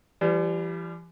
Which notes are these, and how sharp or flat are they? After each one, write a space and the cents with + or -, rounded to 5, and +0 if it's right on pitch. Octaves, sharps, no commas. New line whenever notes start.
E3 +45 G3 +0